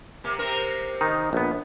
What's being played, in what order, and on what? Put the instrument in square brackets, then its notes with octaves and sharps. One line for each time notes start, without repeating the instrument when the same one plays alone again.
[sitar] C3 A#3
C3 C4 A#4
[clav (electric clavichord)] D#3 D#4
A#1 B3